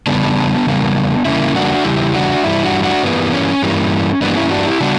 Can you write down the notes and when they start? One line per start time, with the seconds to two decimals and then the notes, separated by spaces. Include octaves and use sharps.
0.07 E2 C#3 G3 B3 D4
0.66 E2 C#3 G3 A#3
1.25 E2 C#3 G3 A#3 C#4 E4
1.55 D4 F#4
1.84 E2 C#3 G3 E4 G4
2.15 D4 F#4
2.44 G2 E3 G3 E4
2.63 D4 F#4
2.83 D4 F#4
3.03 G2 E3 G3 A#3 B3
3.33 C#4
3.62 G2 E3 G3 A#3
4.21 G2 E3 G3 A#3 B3 D4
4.37 C#4 E4
4.51 D4 F#4
4.66 E4 G4
4.81 C#3 G3 B3 D4 F#4